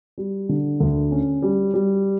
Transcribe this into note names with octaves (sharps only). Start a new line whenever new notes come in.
G3
D3
D2
C#4
G3
G3